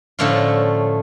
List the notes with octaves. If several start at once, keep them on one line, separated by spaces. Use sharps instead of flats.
A2 D3 F3 A3 C#4 F4